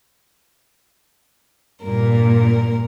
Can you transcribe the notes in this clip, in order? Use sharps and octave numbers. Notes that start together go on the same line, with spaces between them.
G2 A#2 A#4